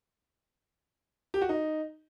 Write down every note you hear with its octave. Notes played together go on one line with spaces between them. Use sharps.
G4
F#4
D#4